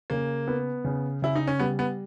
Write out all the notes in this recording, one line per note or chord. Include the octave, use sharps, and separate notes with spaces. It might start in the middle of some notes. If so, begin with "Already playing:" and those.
C#3 A#3
B3
C#3
C#3 E4
D#4
C#4
G3 B3
B3